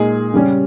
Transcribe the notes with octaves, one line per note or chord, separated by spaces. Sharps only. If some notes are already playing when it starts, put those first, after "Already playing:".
Already playing: A#2 G#3 D#4 G#4
C#3 G3 C#4